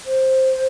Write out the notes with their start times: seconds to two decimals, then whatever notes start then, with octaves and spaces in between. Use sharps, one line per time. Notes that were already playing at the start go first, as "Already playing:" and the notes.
0.06 C5